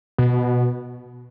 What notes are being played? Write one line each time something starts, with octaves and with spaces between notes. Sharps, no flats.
B2